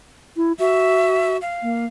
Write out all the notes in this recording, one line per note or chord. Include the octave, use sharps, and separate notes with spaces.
E4
F#4 E5
F5
A#3